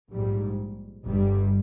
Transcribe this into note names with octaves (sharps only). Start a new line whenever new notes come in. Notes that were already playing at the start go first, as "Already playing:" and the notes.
A#1 G#2 G3
G1 G2 G3